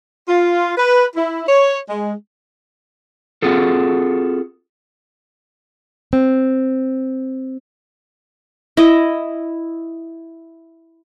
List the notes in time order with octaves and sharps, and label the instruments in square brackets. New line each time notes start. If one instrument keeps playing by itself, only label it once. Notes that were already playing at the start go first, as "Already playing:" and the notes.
[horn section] F4
B4
E4
C#5
G#3
[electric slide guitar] C4 F4 F#4 G#4 A4
[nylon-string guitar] C4
[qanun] E4 D#5